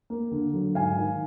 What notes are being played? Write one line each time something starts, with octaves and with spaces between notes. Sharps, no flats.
A#3
D3
F#3
G#2 F5 G#5
D#3